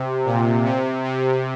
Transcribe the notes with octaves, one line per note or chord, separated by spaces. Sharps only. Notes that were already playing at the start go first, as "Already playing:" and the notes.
Already playing: C3
A#2
C3
C3